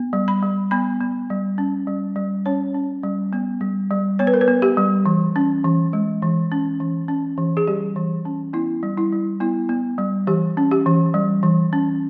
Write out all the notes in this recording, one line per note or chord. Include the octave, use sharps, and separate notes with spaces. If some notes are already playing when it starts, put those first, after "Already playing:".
Already playing: B3
G3
B5
G3
B3 B5
B3
G3
C#4
G3
G3
C#4 C#5
C#4
G3
B3
G3
G3
B3 C#5
B4
A#4
B4
B3
G4
G3
E3
C#4
E3
G#3
E3
C#4
E3
C#4
E3
G#4
G3 G4
E3
C#4
B3 E4
G3
E4
G3
B3 E4
B3
G3
E3 G4
C#4
G4
E3
G3
E3
C#4